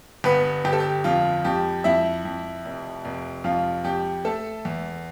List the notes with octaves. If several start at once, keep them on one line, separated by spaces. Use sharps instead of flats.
G1 B3 B4
G1 G4
A4
G4
F2 F4
F2 G4
F2 E4 E5
F2
F1
F1
F2 F4 F5
F2 G4 G5
A3 A4 A5
E2